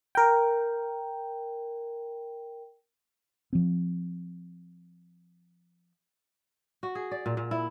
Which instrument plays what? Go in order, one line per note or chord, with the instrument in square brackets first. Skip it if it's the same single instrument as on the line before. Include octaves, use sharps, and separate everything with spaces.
[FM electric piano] A#4 G5
[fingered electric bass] F3 C4
[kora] F#4
G#4
D5
A#2
A#2
E4